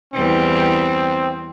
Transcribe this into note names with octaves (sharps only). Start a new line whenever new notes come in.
E2 G3 C4